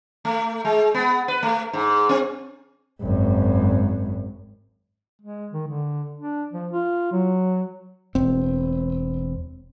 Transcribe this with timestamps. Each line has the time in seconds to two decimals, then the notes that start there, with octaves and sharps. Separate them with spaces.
0.25 A3
0.65 G#3
0.94 B3
1.28 B4
1.43 A3
1.73 G#2
2.09 C4
3.01 G#1 F#2
5.22 G#3
5.52 D#3
5.68 D3
6.17 D4
6.52 F3
6.71 F4
7.12 F#3
8.15 E1 C4